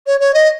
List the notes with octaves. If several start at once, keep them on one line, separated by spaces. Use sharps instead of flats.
C#5
C#5
D#5